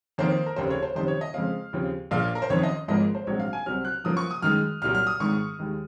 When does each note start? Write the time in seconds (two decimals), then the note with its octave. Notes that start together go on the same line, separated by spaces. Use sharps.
0.18 F2 D#3 A#3 C5
0.46 A#4
0.56 F1 D#2 C#3 C5
0.70 C#5
0.83 C5
0.95 F#1 F2 C3 D#3 C5
1.08 C#5
1.21 D#5
1.34 F2 C#3 G#3 C4 F5
1.73 D#2 C#3 F3 C4
2.11 A#1 A#2 F3 F5
2.35 A#4
2.42 C5
2.50 F#1 F2 D#3 C#5
2.63 D#5
2.88 G#1 G#2 F3 A#3 D#5
3.15 C5
3.27 A#1 G#2 F#3 C4 C#5
3.40 F5
3.53 G#5
3.66 C2 C3 F#3 C4 F6
3.85 F#6
4.04 F#2 F3 A#3 D#6
4.17 C#6
4.31 D#6
4.42 F#2 D#3 G#3 F6
4.82 C2 A#2 F#3 F6
4.95 F6
5.07 D#6
5.20 G#1 G#2 D#3 C#6
5.59 D#2 D#3 G#3